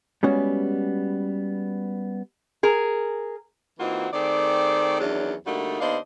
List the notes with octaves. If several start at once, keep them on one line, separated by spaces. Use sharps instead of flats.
G3 G#3 B3 C#4 F#4
G#4 A#4
E3 A#3 C4 D#4 F4 F#4
D#3 A3 C4 G#4 D5
E2 D#3 E3 F#3 C#4 D4
D3 G3 A3 A#3 D#4 F#4
D#2 B3 D4 C5 D#5 F5